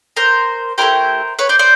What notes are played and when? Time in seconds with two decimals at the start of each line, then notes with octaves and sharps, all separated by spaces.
0.17 A#4 C5
0.78 A3 C4 E4 G4 A#4 C5
1.39 B4 C#5
1.49 C5 D5
1.59 C5 D5